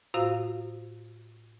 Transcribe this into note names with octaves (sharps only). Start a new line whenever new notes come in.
A2 F4 F#4 C5 F5 E6